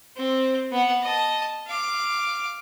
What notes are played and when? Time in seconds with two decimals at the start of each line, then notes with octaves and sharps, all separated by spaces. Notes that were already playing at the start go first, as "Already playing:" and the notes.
0.17 C4
0.72 B3 F#5
1.02 D#5 A5
1.67 F5 D6